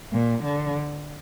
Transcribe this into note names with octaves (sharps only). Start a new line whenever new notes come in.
A#2
D3